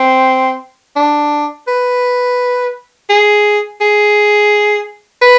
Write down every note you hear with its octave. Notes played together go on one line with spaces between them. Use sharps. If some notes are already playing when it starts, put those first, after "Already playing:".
Already playing: C4
D4
B4
G#4
G#4
B4